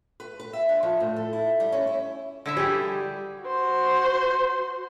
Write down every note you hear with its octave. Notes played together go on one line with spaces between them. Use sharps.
B4
B4
E5
D4
F3
A2
A4
E4
G3
C#4
E4
D3 E4 E5
G3 G4 G#4
F#4 C5